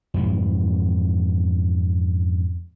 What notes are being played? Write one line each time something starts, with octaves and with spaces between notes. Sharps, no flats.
F2 G#2 C3 E3